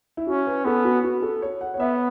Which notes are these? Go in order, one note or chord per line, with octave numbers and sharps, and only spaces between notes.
E4
C#4 F#4
B4
B3 A4
F#4
F#4
A4
C#5
F#5
C#5
B3 E5